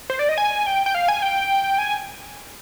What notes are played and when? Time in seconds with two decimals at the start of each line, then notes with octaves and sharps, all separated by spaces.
0.10 C5
0.19 D5
0.29 D#5
0.38 G#5
0.67 G5
0.86 G5
0.95 F5
1.08 G#5
1.22 G5
1.78 G#5